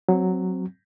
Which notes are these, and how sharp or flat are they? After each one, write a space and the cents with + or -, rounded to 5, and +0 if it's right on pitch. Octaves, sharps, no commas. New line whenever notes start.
F#3 +0 C4 +0